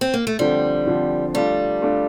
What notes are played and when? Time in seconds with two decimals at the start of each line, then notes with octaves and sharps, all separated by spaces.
0.01 C4
0.14 A#3
0.27 A3
0.39 D3 F3 G3 C4
0.87 D3 F3 C4
1.34 G3 A3 D4 F4
1.82 A3 D4 F4